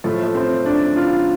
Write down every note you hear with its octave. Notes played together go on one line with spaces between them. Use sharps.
A2 F3 A3
A3
C4
D4
F4